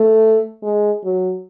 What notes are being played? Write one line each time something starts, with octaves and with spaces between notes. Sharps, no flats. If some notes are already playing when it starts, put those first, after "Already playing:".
Already playing: A3
G#3
F#3